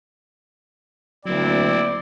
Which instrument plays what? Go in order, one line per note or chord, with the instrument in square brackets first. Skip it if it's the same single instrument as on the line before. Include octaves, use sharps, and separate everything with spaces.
[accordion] D2 [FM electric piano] F#3 A#3 [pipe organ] C4 E4 [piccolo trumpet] D5